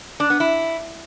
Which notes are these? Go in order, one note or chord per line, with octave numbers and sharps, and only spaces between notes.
D4
B3
E4